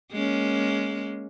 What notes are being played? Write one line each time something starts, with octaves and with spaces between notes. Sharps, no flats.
G#3 A#3 C#4